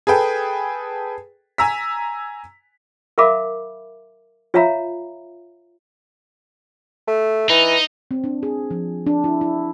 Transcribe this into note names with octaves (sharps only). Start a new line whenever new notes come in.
G#4 A4 B4 G5
G#5 A#5 E6 B6
A#4 E5 F5 B5 D6
F4 C#5 E5 F5 A#5 B5
A3
E3 D#4
C4
D4
G#4
F3
D4
E4
E4